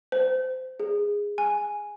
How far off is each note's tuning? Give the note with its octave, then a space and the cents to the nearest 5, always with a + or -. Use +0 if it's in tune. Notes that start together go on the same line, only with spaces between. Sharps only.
C5 -20
G#4 -15
G#5 +0